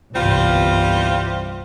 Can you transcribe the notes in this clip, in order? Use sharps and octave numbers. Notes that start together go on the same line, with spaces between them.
G1 C2 E3 G3 C4 F4